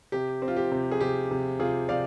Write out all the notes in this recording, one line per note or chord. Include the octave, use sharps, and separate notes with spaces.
C3 G4
C4
F4
G4
C3
G#4
C3 G4
C3
C3 F4 G#4
C3 D5 F5